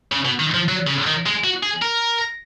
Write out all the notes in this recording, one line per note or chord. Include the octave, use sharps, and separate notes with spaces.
C#3
B2
D#3
F3
F#3
C#3
D#3
G#3
F#4
G#4
A#4